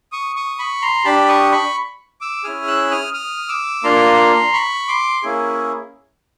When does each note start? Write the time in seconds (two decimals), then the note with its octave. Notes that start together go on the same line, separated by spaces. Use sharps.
0.12 C#6 D#6
0.36 C#6 D#6
0.58 B5 C#6
0.82 A#5 C6
1.05 D4 G4 A5 B5
1.28 C#6 D#6
1.52 B5 C#6
2.21 D6 E6
2.44 C#4 E4 G#4 D#6 F6
2.68 E6 F#6
2.91 D#6 F6
3.14 D#6 F6
3.49 D6 E6
3.84 A#3 D4 F4 A#5 C6
4.53 B5 C#6
4.88 C6 D6
5.23 A#3 C#4 E4 G#4